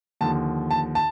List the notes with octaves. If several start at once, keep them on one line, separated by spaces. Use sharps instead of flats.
D#2 D3 F3 A5
A5
A5